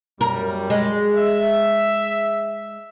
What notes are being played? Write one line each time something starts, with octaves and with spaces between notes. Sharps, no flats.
F#2 G3 A#4
G#3
E5